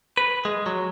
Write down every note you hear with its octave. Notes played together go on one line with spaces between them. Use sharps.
B4
G#3
F#3